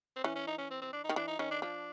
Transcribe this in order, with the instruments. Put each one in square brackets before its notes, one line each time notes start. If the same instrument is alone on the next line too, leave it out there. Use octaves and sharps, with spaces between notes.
[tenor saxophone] C4
[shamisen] E3 [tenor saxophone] C#4
[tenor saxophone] C#4
D#4
C#4
C4
C4
D4
[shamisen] D#3 [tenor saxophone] D#4
[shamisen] E3 [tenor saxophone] D4
[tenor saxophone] D#4
[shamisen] D#3 [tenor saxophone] C#4
[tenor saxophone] D4
[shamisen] F3 [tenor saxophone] D4